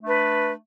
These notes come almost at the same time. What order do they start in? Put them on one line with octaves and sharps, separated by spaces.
A3 D4 B4